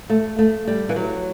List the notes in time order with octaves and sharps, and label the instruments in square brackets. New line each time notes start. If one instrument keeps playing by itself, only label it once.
[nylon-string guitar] A3
A3
G3
E3
F#3